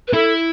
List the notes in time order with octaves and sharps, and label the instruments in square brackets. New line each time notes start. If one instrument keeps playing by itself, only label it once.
[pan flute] B4
[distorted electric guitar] E4 [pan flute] A4